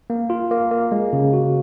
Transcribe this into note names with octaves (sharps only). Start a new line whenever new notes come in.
A#3
F4
A#3
A#3
G#3
C#3
F#4